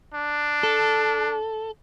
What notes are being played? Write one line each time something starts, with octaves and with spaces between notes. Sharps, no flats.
D4
A4